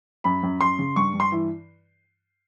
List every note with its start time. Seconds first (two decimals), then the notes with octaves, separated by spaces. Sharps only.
0.24 F#2 B5
0.43 F#2
0.61 F#2 C6
0.79 C#3
0.96 G2 C#6
1.14 G2
1.20 C6
1.32 E3